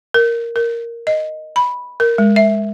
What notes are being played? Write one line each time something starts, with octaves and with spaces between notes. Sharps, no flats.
A#4
A#4
D#5
B5
A#4
G#3
E5